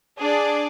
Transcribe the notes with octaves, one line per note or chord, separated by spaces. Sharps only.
D4 G#4 D5